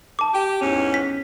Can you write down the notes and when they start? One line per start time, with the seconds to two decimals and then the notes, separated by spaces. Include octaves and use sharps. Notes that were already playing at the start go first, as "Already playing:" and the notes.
0.19 A5 D6
0.33 G4
0.61 E2 G#2 C#4
0.94 B6